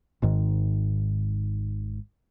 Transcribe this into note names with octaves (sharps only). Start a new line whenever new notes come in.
G#1 G#2 D#3